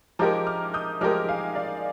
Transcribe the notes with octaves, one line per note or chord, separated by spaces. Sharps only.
F3 G#3 D#4 G4 A#4 A#5 D6
D6 F6
D#6 G6
F3 G#3 D#4 G4 A#4 D6 F6
F5 G#5
D5 F5